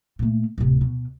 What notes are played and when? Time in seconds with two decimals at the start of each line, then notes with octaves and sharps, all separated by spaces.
0.19 A#2 A3
0.58 D1 C3
0.81 B2